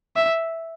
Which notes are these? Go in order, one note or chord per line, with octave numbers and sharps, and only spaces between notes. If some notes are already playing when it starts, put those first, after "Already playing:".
E5